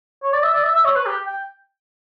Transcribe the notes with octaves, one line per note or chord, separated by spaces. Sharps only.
C#5
D5
E5
D5
E5
E5
C#5
B4
G4
G5